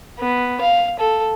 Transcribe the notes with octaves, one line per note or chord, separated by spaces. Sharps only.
B3
F5
A4